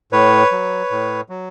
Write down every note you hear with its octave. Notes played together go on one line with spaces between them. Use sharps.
A2 B4 C#5
F#3
A2
F#3